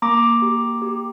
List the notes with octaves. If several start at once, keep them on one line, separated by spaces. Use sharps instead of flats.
A#3 A#5 D6
G4
G4